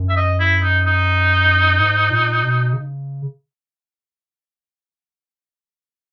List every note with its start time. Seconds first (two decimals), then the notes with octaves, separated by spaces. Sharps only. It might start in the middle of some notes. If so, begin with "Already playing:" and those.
Already playing: F#2
0.10 E5
0.16 D#5
0.40 E4
0.63 D#4
0.86 D#4
1.80 G#2
2.11 A#2
2.43 B2
2.73 C#3